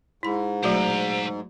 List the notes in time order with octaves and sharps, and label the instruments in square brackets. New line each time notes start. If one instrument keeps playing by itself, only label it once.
[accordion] G#2 [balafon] E4 B5
[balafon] F#3 A3 F#4 [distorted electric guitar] C5 A#5